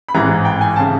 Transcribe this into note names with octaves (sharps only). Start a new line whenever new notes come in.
B5
A1 G#2 E3 A#5
G5
G#5
A5
C#3